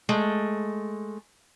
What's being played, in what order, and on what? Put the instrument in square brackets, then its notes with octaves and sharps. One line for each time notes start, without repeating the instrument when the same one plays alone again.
[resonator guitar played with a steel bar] G#3 A3